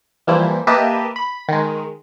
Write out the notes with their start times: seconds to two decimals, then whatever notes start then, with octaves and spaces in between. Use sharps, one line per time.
0.27 E3 F3 G3 A#3 E4 C5
0.67 A#3 G4 B4 D#5 E5 A5
1.16 B5
1.48 D#3 G#3